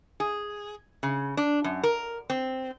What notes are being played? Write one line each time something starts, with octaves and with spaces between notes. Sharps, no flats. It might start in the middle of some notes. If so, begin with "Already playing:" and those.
G#4
C#3
D4
F#2
A#4
C4